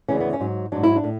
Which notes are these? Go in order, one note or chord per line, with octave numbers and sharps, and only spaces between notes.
D2 C#3 E3 C#4
B3
C#4
G#2 F#3
G#2 F#3 D4
E4
D4
A2